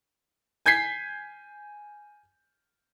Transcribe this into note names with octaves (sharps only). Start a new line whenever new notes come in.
G#5 G6 G#6 B6 C7